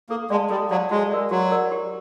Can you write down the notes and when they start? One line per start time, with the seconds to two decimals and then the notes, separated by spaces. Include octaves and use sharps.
0.09 A#3 A4
0.30 G#3 D5 F5 A5
0.50 G3 A4
0.71 F#3 D5 F5 A5
0.91 G#3 F#4
1.12 A#4 D5
1.31 F#3 F#4
1.52 A#4 D5
1.72 G4